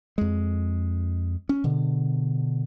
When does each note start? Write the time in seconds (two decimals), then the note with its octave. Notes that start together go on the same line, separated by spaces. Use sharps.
0.18 F2 G#3
1.49 C#4
1.64 B2 D3